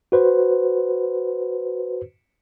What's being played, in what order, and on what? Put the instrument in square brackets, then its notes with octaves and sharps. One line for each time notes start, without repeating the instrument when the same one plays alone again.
[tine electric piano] F#4 B4 C5